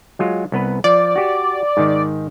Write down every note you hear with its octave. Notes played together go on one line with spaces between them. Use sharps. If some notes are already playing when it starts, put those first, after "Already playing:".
F#3 G#3 F4
C2 B3 B4
F3 D5
F#4 G4
G#2 D#3